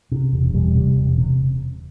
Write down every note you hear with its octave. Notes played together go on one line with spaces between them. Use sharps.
C3
E1
E1 G3
C3
E1
C3